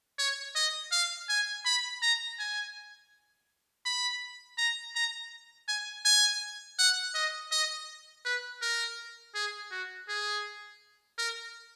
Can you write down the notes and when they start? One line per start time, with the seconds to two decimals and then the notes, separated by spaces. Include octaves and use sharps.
0.19 C#5
0.56 D#5
0.92 F5
1.29 G#5
1.65 B5
2.02 A#5
2.39 G#5
3.86 B5
4.58 A#5
4.96 A#5
5.68 G#5
6.05 G#5
6.79 F#5
7.15 D#5
7.52 D#5
8.25 B4
8.62 A#4
9.35 G#4
9.71 F#4
10.09 G#4
11.18 A#4